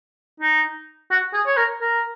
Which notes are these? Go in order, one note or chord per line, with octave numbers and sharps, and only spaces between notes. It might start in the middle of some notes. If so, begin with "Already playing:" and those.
D#4
F#4
G#4
C#5
A#4
A#4